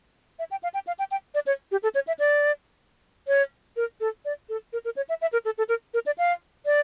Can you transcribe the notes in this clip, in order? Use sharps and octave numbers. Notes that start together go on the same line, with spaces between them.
E5
G5
F5
G5
F5
G5
G5
D5
C#5
G4
A4
C#5
E5
D5
C#5
A#4
A4
D5
A4
A#4
A#4
C#5
E5
E5
A#4
A4
A4
A#4
A#4
D5
F5
D5